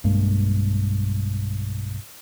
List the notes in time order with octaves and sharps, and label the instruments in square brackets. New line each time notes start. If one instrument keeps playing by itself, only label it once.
[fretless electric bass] B1 G2 G#3 A#3